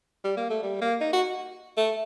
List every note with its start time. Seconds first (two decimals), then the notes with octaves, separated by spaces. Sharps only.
0.24 G3
0.37 A#3
0.50 A3
0.63 G3
0.81 A#3
1.01 D#4
1.13 F#4
1.77 A3